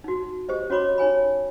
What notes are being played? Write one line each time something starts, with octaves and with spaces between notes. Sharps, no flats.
D#4 F#4
G4 C5 D#5
C#4 F#4 C#5 B5 D6
D#4 C#5 G#5 B5